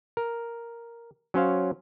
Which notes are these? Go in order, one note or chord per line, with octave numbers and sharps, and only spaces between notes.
A#4
F#3 C#4 C5 F5